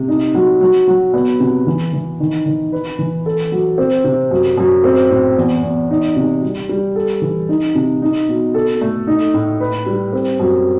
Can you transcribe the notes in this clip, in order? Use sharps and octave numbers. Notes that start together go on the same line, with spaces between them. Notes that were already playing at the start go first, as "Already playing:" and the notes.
Already playing: C3
D#4
F#3
F#3
F#3
B3
C3
E3
E3
D#3
D#3
B4
E3
A4
F#3
C4
C3
F#2
F#2
C4
A2
E2
E2
D#4
C3
G3
G3
A4
E3
D#4
C3
D#4
B2
A4
A3
D#4
A2
B4
G3
C4
F#2